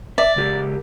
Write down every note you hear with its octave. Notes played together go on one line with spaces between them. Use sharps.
D5 E5
C#2 G4 A#4